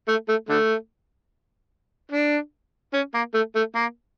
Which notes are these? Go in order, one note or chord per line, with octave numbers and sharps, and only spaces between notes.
A3
A3
D3 A3
D4
C#4
A#3
A3
A3
A#3